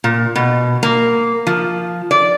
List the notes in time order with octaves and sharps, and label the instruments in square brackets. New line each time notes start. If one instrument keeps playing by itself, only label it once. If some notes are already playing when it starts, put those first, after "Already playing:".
[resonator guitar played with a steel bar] A#2
B2
A#3
F3
D5